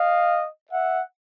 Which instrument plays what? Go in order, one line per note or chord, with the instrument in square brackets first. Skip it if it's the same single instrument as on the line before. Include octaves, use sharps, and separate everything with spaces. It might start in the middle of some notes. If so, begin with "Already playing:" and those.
Already playing: [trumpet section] D#5 F5
E5 F#5